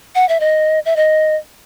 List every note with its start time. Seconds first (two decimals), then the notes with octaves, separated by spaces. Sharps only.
0.15 F#5
0.29 E5
0.40 D#5
0.86 E5
0.96 D#5